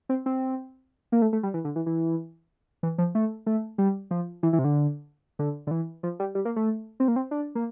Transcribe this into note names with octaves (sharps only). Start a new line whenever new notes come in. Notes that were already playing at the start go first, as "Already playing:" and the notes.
C4
C4
A#3
A3
A3
G3
E3
D3
E3
E3
E3
F3
A3
A3
G3
F3
E3
E3
C3
D3
D3
D3
E3
F3
G3
G3
A#3
A3
C4
A#3
C4
D4
A#3